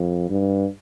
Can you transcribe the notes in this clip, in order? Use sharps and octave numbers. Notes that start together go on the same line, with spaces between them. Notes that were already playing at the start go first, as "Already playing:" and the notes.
Already playing: F2
G2